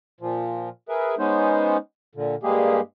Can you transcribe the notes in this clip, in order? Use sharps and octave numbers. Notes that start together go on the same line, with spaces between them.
A#2 F3
G#4 A#4 B4 E5
G#3 B3 C#4 D#4 C5
A#2 D3
G2 G3 G#3 A#3 G4 G#4